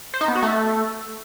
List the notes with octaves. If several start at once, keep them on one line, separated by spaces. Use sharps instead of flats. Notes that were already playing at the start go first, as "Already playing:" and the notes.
C5
D#4
B3
F#4
A3